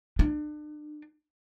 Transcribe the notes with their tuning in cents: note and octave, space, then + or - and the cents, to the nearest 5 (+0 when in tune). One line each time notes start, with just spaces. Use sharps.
D4 +35